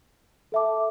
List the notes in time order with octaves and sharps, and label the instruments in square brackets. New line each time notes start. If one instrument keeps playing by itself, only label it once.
[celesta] A4 E5 A5 D6